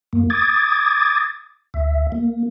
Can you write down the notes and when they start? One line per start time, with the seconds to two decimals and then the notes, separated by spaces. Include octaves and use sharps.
0.13 F#2 A#3
0.30 D6 D#6 G#6 A6
1.74 D2 E5
2.12 A#3